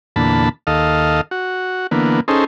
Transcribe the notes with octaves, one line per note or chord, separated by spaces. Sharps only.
E2 A#2 D3 A5 B5
D#2 A4 D#5 F5
F#4
D3 E3 A#3 B3
C#4 D#4 G#4 A4 C5